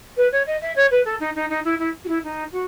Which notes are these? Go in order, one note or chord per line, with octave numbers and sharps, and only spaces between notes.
B4
C#5
D#5
E5
C#5
B4
A4
D#4
D#4
D#4
E4
E4
F#4
E4
D#4
F#4